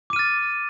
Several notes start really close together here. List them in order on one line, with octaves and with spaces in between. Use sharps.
D6 D#7 F6 A6